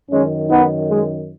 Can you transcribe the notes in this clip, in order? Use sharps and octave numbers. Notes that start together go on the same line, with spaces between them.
F#2 D#3 G#3 C#4
B3 D#4
G#3